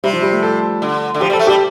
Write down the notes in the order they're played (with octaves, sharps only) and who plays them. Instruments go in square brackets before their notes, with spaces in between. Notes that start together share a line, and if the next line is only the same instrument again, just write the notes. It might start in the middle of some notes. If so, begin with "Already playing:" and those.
[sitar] C3 [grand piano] G3
[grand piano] F3
G3
A3
A4
[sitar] D3
D3
[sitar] F3 [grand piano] G4
[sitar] G3
[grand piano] A4
[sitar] A3
[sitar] G3 [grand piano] G4